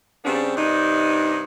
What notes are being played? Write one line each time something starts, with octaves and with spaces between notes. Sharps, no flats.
C#3 G3 B3 C4 D4
G2 C3 D4 D#4